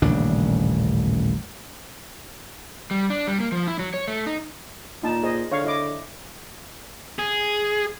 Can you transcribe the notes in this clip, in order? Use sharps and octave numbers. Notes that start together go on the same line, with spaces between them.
D#1 A1 C#3 D4
G3
D4
G3
A#3
F3
E4
F#3
C#5
A3
D#4
A#2 D#4 A5
G#4 C5 D#5
D3 C#5 F5 C#6
E4 D#5 D6
G#4